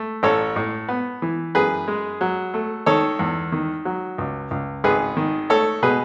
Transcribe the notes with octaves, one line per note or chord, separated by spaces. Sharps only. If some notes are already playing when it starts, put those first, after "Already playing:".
Already playing: A3
A1 A4 C#5
A2
B3
E3
F#2 G#4 B4
G#3
F#3
A3
D#3 A4 C#5
E2
D#3
F#3
C#2
C#2
G#1 G#4 B4
D#3
A3 A4 C#5
B2 G#4 B4